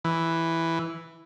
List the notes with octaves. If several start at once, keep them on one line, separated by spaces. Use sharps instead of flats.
E3